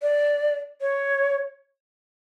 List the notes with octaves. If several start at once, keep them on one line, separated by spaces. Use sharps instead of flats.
D5
C#5